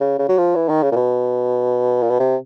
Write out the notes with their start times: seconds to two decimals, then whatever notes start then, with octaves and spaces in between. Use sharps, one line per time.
0.01 C#3
0.19 C#3
0.29 F#3
0.38 F3
0.55 E3
0.69 D#3
0.83 C#3
0.92 A#2
0.96 B2
2.03 A#2
2.10 B2
2.19 C3